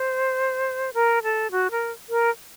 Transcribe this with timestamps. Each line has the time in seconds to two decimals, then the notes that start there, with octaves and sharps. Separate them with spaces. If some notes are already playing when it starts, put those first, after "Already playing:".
Already playing: C5
0.94 A#4
1.23 A4
1.51 F#4
1.71 A#4
2.10 A#4